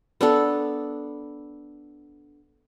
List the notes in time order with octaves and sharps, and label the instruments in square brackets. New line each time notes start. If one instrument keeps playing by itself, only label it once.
[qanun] B3 D4 A4